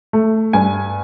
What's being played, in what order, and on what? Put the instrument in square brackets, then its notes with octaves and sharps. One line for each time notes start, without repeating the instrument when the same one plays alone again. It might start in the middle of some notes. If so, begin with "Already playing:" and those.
[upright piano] A3
G2 G#5